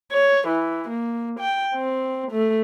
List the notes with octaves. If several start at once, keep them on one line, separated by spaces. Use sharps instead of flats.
C#5
E3
A#3
G5
C4
A3